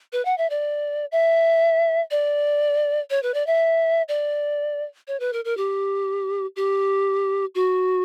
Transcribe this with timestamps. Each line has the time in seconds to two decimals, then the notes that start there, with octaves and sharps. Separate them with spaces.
0.13 B4
0.25 F#5
0.38 E5
0.50 D5
1.12 E5
2.11 D5
3.10 C#5
3.23 B4
3.34 D5
3.47 E5
4.08 D5
5.08 C#5
5.20 B4
5.33 A#4
5.45 A#4
5.57 G4
6.56 G4
7.55 F#4